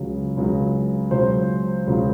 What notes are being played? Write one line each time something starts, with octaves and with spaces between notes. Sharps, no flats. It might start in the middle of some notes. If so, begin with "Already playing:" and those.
Already playing: C#2 C#3 F#3
C#2 C#3 F#3
C#2 C#3 F#3 C5
C#2 C#3 F#3